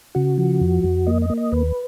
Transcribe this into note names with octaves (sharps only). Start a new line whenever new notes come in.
C#3 F#4
F3
F2
F2
A#3 D#5
D#5
A#3
D#5
D#2 B4